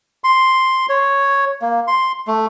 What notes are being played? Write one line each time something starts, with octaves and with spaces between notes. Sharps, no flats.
C6
C#5
A#3
C6
A3